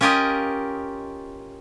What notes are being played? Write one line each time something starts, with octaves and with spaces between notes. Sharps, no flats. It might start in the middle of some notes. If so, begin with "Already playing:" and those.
C#4 F4 G4 A#4 D#5